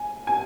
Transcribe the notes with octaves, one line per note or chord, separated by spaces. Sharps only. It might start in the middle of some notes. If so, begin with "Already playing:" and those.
Already playing: G#5
G#5